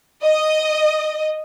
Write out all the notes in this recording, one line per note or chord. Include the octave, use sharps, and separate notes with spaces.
D#5